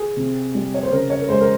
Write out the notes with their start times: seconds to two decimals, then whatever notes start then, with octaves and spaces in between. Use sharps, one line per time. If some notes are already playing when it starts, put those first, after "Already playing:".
Already playing: G#4
0.17 C3
0.55 G3
0.74 C#5
0.83 C5
0.91 C#3 A#4
1.10 C#5
1.22 A#4
1.29 G#3 C5
1.41 A#4